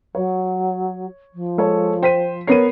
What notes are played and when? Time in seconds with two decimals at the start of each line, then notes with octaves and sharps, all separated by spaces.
0.15 F#3 C#5
1.34 F3
1.58 G#3 A4 C#5
2.03 C5 G5 B6 D#7
2.47 B3 A#4 C#5 C7 D#7